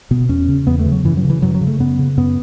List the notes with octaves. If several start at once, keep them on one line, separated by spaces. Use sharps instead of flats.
B2 B3
E2 C#4
C#3
E2 B3
A3
C#3
F#3
F#2 E3
F#3
C#3
E3
F#2 F#3
F#3
C#3
A3
F#2 B3
C#3
F#2 B3